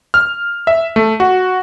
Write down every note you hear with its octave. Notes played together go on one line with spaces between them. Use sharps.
F6
E5
A3
F#4